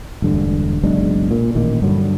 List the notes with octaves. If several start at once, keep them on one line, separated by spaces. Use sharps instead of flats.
E1 D2 G2 D3
F#1 B1 G#3 D4
A#2
A1 A#2 D#3
G2 D3 F#3